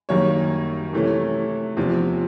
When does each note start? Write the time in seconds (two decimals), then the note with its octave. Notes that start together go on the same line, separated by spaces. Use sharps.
0.09 F#2 D#3 G3 A#3 C#5
0.93 C3 E3 A3 C#4
1.77 E2 C3 F3